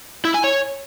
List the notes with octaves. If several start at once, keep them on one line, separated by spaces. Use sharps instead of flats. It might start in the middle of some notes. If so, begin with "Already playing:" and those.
E4
G#5
C#5